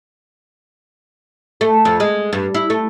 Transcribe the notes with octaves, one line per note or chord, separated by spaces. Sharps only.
A3
F2
G#3
G2
E4
A3